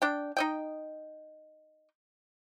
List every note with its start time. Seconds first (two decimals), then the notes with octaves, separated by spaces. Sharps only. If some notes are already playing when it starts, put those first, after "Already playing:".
0.02 D4 G5
0.37 D#4 D#5 G5